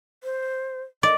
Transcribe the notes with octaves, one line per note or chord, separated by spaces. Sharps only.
C5
D5 D#5